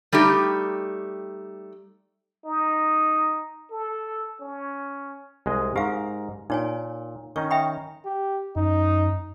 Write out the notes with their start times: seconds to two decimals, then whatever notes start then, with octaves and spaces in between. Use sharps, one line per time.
0.12 G3 A3 D#4 G4
2.45 D#4
3.71 A4
4.41 C#4
5.46 C2 G#3 D#5
5.76 G#2 G4 A#4 F5
6.50 A#2 D#4 C#5 G#5
7.36 D#3 C#4 D#4 C#6
7.51 E5 G5 B5
8.05 G4
8.56 F#2 D#4